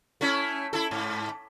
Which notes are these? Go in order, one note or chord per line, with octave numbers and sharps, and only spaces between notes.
A3 C#4 E4
E4 A4
G#2